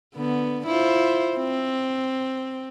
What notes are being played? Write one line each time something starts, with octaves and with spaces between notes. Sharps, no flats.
D3 B3
E4 F4 C5
C4